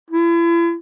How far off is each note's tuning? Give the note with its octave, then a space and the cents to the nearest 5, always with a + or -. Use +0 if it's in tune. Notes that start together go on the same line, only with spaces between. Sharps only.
E4 +40